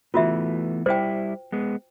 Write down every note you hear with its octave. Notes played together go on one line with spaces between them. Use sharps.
E3 A3 B3 F4 F#4 E5
G3 E4 C5 G5
G#3 B3